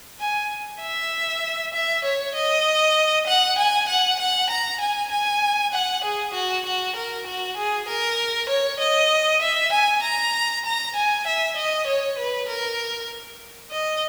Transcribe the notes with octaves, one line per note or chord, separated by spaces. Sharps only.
G#5
E5
E5
C#5
D#5
F#5
G#5
F#5
F#5
A#5
G#5
G#5
F#5
G#4
F#4
F#4
A#4
F#4
G#4
A#4
C#5
D#5
E5
G#5
A#5
A#5
G#5
E5
D#5
C#5
B4
A#4
D#5